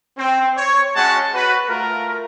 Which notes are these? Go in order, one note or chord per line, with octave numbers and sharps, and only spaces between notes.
C4
C#5
G#3 C#4 F#4 F#5 A5
F#4 B4
A3 F4 A#4